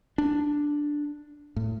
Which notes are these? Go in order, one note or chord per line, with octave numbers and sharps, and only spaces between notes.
D4
A2